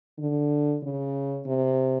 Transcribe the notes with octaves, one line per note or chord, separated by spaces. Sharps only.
D3
C#3
C3